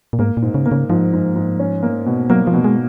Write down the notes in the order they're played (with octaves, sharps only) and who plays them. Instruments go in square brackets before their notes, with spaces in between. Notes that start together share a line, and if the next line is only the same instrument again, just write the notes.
[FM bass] A#2
[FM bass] G#2 [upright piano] A#3
[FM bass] A#2
[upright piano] G#2
[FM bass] C#3
[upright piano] A#3
[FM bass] C#3
[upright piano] G#2 [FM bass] F3
[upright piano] G#2
G#2
C#4
A#3
B2
[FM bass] F#3 [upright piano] A#3
[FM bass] F3
[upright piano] B2
[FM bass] G#3